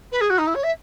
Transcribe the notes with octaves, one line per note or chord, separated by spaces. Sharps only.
B4
G#4
F#4
D#4
E4
C#5
E5